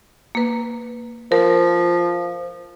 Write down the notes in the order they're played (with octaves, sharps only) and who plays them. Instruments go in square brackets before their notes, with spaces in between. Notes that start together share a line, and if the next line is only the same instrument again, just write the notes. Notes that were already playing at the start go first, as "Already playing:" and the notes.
[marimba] A#3 B4
[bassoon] F3 [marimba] A#4